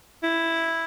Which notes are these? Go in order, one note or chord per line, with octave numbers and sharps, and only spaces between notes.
E4